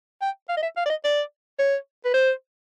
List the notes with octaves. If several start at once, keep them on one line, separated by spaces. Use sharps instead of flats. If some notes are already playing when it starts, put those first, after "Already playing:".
G5
F5
D#5
E5
F5
D5
D#5
D5
C#5
B4
C5